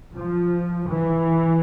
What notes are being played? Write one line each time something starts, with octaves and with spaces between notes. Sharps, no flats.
F3
E3